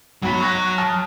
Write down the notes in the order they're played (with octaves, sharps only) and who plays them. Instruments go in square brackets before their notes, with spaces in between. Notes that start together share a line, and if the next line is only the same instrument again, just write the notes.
[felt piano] B1 B5 B6 [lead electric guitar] F#3 C#5
[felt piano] C#6 F#6 A#6
A5 D#6 F6